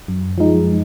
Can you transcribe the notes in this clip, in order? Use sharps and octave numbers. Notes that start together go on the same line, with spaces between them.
F#2
F3 G#3 D#4